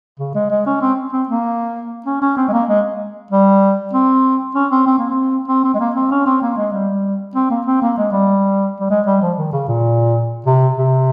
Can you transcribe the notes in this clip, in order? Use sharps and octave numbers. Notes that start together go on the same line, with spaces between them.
C#3
G#3
G#3
C#4
C4
C4
A#3
C#4
C#4
C4
G#3
A#3
G#3
G3
C4
C#4
C4
C4
A#3
C4
C4
C4
G#3
A#3
C4
C#4
C4
A#3
G#3
G3
C4
A#3
C4
A#3
G#3
G3
G3
G#3
G3
F3
D#3
C#3
A#2
C3
C3